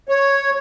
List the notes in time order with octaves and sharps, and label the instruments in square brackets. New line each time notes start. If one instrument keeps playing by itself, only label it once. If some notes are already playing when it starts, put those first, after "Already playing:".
[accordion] C#5